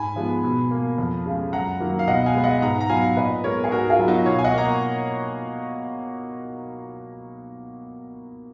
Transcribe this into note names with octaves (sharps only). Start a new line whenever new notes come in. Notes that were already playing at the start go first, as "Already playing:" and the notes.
Already playing: G#2 G#5 B5
F3 G#3 B3
B2
A#3
F2
C#3 G#3
F#2 F#5 A#5
D#3 F#3 A#3
F5
B2 D#5 F#5
F5 G#5
G#3 B3
D#5 F#5
G#2 F#5 A#5
A#5
F#3 B3 F5 G#5
A#2 B4 D#5
G#3 B3 A#4 C#5
G#4
G#2 F#4 A#4
F4 G#4
F#3 B3
D#4 F#4
B2 C#5 F5
G#5
D#5 F#5
A#3 A#5